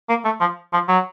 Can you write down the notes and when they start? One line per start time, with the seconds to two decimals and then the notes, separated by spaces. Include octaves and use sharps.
0.09 A#3
0.25 A3
0.41 F3
0.73 F3
0.89 F#3